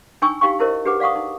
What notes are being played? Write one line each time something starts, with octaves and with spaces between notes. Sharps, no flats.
D4 D#4 G5 G#5 C#6 E6
D#4 G4 F5 G5 C#6
D#4 E4 A#4 C5 D#5
D4 G4 G#4 B4 F#5 D6
D5 F5 F#5 C#6 D#6
D#4